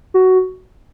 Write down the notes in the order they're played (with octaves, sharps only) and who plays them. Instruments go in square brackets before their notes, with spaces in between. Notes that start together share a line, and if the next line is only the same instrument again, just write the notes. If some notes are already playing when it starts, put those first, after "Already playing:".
[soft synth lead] F#4